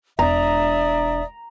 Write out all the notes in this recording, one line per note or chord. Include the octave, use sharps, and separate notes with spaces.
E1 D4 D5 E5 A#5 D#6